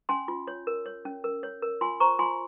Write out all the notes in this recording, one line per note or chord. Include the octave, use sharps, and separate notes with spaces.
C#4 G#5 C6
F4
C#5
A#4
C#5
C#4
A#4
C#5
A#4
F4 G#5 C6
C5 A#5 C#6
F4 G#5 C6